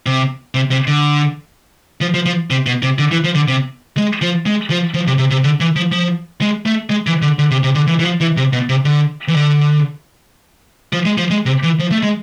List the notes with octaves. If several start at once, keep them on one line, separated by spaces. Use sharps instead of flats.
C3
C3
C3
D3
F3
F3
F3
C3
B2
C3
D3
E3
F3
D3
C3
G#3
F3
G#3
F3
F3
C3
C3
C3
D3
E3
F3
F3
G#3
A3
G#3
E3
D3
D3
C3
C3
D3
E3
E3
F3
E3
C3
B2
C3
D3
E3
D3
F3
G#3
F3
G#3
C3
E3
F3
A3
G#3